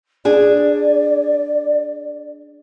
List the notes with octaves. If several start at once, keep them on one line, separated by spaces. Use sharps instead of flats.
D4 G#4 D5